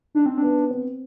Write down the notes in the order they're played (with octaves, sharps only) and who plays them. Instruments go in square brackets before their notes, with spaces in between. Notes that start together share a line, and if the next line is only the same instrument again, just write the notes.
[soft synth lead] D4 [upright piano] D#4
[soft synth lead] C4
[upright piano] B3 [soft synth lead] D4
[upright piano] C4